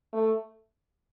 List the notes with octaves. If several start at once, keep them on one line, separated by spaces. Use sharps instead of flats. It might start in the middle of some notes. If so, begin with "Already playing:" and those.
A3